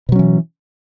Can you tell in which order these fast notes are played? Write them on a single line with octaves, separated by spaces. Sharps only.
B2 F#3 C#4 E3